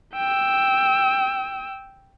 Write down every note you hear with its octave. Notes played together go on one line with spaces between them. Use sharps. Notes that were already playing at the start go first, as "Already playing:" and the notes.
G5 E6